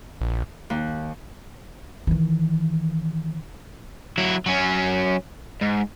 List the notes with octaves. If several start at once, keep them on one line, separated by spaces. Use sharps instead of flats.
A#1
D#2
D#3 E3
F#3 E4
F#3 C#4
G#2